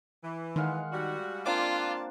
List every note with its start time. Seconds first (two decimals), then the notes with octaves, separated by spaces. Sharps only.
0.24 E3
0.56 D#3 G#3 F5 F#5
0.92 G3 F#4
1.46 A#3 C4 D4 F4 D5 A5 D6